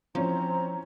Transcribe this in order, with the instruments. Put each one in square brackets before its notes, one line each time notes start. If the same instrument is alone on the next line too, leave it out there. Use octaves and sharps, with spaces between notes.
[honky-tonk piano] E3 C#4 C5 [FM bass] F3 [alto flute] C4 [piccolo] A#5